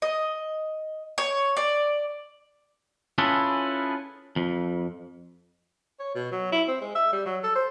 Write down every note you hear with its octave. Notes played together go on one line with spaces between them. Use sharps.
D#5
C#5
D5
C#4 E4 F4 G#4 A4 B4
F2
C#5
B2
F#3
E4
C4
G#3
E5
G3
F#3
A4
C5